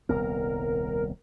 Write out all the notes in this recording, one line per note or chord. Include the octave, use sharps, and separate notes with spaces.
D#1 C2 B3 A#4